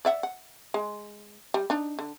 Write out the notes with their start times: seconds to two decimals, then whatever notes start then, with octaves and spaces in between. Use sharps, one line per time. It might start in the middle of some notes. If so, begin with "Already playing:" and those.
0.05 D5 E5 F#5
0.23 F#5
0.74 G#3
1.54 G3
1.70 D4 D#4
1.99 D3